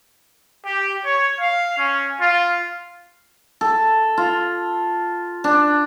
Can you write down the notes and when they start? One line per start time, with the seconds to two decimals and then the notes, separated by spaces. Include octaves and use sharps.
0.66 G4
1.06 C#5
1.40 F5
1.78 C#4
2.22 F4
3.61 A4
4.18 F4
5.44 D4